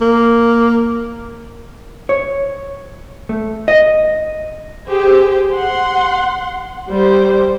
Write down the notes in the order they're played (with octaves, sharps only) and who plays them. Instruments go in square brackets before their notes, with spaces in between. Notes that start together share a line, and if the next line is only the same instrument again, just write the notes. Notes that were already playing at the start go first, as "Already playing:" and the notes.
[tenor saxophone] A#3
[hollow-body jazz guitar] C#5
A3
D#5
[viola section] G4 G#4 C5
F#5 C6
G3 C5